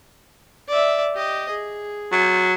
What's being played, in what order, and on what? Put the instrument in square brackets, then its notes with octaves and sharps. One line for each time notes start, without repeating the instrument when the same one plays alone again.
[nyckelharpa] D5 E5
G4 D#5
G#4
[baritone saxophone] F#3